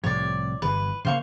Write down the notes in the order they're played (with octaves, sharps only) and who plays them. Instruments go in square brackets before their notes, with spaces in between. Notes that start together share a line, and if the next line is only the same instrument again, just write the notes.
[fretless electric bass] C2 A2 F3 [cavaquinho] C#5 D5
[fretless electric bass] G1 E3 [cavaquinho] B4
[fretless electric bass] C#3 E3 A#3 [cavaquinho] C5 F5 C#6